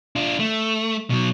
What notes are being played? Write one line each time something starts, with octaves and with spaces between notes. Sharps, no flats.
D4 F4
A3
B2 F#3